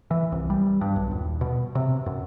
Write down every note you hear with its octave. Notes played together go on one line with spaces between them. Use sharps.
E3
C2
G3
G2
B1
D#1
B2
C3
F#2